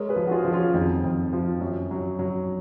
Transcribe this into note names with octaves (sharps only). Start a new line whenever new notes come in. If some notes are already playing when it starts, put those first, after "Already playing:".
Already playing: G#3 A#4 C#5
G#4 B4
F3
F#4
F4 G#4
F3
C#4 F4
F2 D#4
F2
F3
F#2
F#3
F#3